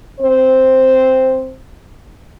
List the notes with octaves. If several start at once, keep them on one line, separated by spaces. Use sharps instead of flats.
C4 C5